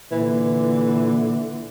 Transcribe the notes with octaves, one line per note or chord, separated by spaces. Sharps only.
A#2 D3 E3